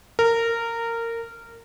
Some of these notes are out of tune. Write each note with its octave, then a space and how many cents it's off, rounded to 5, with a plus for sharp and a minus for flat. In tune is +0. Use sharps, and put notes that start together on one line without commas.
A#4 -20